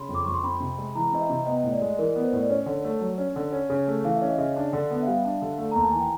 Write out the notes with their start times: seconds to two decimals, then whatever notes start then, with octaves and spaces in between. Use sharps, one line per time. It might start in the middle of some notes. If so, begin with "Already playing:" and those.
Already playing: C#3 B5 C6
0.09 F2
0.15 D6
0.25 F2 C#6
0.34 C6
0.43 C4 B5
0.60 C3
0.78 G#3
0.95 E3 A#5
1.12 C4 D#5
1.21 E5
1.30 C3
1.47 B3 D#5
1.64 A2
1.72 D5
1.82 G#3
1.98 E3 A#4
2.16 B3
2.24 C5
2.33 A2
2.41 D5
2.50 C#4 C#5
2.66 D3
2.85 A3
3.01 F#3
3.18 C#4
3.36 D3
3.52 C#4
3.70 C#3
3.87 A3
4.04 E3 F5
4.16 E5
4.22 C#4
4.28 D#5
4.38 C#3 E5
4.56 D4
4.73 D3
4.91 B3
5.02 E5
5.07 G3 F5
5.24 D4
5.42 D3
5.58 A3
5.72 D#2 A#5
5.81 A5
5.91 E3 G#5
6.00 G5